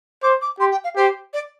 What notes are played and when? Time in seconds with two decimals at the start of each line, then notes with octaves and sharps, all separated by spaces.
0.23 C5 D6
0.41 D6
0.60 G4 C6
0.72 G5
0.84 F5
0.96 G4 C5
1.33 D5